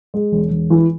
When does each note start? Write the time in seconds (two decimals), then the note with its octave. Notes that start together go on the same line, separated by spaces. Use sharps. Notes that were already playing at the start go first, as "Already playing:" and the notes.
0.14 G#3
0.32 E1
0.50 E1
0.70 E3